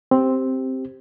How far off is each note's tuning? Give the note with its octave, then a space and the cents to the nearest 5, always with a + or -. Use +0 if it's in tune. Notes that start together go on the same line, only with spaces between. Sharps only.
C4 +0 G4 +0